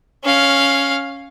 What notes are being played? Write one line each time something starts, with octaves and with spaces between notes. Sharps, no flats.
C#4 F5